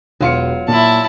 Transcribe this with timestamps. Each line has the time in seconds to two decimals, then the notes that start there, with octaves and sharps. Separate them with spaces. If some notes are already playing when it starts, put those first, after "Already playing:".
0.21 E1 F#3 F4 C#7
0.68 A#2 E4 A5